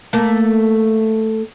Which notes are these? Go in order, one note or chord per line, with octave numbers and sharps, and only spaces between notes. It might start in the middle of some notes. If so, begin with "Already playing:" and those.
A3 A#3